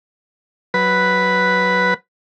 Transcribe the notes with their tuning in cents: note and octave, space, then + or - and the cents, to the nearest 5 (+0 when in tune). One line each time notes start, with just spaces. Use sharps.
F#3 +0 B4 +0